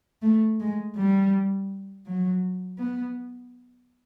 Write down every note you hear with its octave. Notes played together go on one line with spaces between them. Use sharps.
A3
G#3
G3
F#3
B3